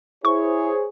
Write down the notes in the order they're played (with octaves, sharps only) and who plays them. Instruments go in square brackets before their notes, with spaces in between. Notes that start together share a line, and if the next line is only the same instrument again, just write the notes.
[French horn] E4 [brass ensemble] G#4 C5 C#5 [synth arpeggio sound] C#6